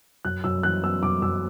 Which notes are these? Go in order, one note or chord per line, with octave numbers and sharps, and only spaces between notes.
F#2 F#6
F#2 E6
E3 F#6
B3 E6
F#2 D6
F#2 E6